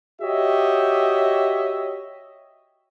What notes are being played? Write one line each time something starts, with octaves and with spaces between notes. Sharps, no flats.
F#4 G4 C#5 D#5 E5